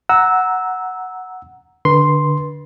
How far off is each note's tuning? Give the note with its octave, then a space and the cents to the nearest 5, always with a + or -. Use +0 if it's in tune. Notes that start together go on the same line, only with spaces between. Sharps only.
F#5 +0 A#5 +0 E6 -10
D3 +0 B4 -25 C6 +0